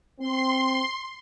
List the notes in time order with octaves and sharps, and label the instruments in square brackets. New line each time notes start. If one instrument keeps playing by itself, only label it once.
[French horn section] C4 [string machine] C6